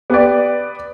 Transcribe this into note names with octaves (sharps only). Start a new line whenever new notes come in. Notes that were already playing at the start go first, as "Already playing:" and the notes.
B3 G4 B4 D5